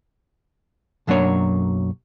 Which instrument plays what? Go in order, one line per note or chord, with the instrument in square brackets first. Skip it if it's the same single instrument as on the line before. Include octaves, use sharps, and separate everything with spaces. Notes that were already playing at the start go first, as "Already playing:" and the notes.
[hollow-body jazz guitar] B1 F#2 F#3 A#3 D4 C#5